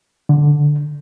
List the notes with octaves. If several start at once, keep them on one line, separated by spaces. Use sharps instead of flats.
D3